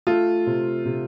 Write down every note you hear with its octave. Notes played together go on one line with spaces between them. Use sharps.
A3 F4 A4
C3
C3